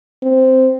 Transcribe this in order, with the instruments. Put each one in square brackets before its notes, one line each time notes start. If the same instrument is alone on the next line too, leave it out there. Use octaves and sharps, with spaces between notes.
[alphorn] C4